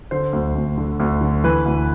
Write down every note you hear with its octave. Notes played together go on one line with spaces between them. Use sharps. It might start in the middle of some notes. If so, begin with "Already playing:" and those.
D3 C5
D2
D2
D3
D2
D3
E3 B4
D2